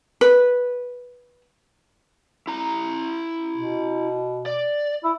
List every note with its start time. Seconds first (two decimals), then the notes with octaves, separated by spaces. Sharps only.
0.21 B4
2.47 E4 A#5
3.57 B2
4.46 D5
5.04 E4